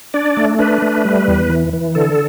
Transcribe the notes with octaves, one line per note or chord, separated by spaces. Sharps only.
D4 D5
A3
D4 B4
A3
G3
E2
E3
E3
D3 A4